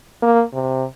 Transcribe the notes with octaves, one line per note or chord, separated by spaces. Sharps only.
A#3
C3